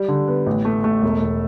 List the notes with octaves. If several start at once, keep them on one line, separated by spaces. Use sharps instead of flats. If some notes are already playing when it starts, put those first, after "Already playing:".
Already playing: G3
D3
B3
A1
A3
A3
E1
E1